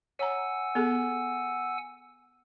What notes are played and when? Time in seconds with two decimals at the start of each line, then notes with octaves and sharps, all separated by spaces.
0.19 C#5 F#5 G#5 A#5 E6
0.75 B3 G#4 A4